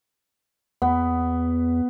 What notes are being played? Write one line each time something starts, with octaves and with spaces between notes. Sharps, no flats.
E2 B3